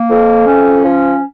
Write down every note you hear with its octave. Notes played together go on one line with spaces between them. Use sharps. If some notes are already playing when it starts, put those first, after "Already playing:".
Already playing: A#3
F2
C#4
F3